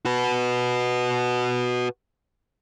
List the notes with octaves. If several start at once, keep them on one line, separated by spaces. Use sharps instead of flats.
F#4 B4